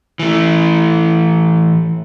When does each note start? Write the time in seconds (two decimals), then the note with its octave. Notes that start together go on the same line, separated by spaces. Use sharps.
0.19 E3 A3